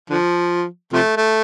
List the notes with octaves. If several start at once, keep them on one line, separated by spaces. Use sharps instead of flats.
D3 F3
C3 F3 A3
A3